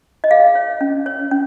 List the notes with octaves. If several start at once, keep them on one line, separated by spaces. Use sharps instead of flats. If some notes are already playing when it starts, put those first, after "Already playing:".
D#5
G#4 F5
C#5
C#4
C#5
C#4